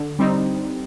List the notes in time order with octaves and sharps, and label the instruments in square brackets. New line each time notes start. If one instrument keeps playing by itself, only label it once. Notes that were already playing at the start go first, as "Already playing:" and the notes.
Already playing: [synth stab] D3
G3 C4 D#4